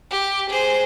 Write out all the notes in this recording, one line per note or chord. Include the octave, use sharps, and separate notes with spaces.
G4
G#4 C5